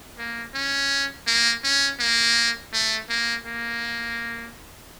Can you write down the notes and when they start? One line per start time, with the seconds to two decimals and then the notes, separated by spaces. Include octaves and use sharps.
0.18 A#3
0.54 C#4
1.27 A#3
1.64 C#4
1.99 A#3
2.73 A3
3.09 A#3
3.46 A#3